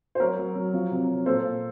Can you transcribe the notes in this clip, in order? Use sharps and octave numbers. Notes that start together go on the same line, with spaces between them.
C5
F#3 A#4 C#5
F#3
F#3
F3
C3
C3
A#2 A4 C5
A#2